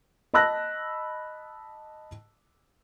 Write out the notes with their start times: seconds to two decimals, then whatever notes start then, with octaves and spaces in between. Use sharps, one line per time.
0.34 D#5 A5 B5 E6 F#6 A#6